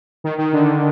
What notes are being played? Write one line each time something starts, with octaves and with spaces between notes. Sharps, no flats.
D#3
D#3
D3